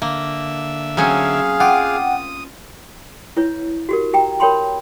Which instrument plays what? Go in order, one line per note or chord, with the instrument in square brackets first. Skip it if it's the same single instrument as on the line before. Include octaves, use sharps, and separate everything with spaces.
[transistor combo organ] D3 E5 [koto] A#3
[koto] F#3 C4 C#4 [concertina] G#4 F5
[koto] F4 [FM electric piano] F#5 G5 D6 [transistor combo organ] D#6
[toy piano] E4 B4 C#5
F#4 G4 A#4
G4 G5 A#5
A#4 C#5 G5 B5 C6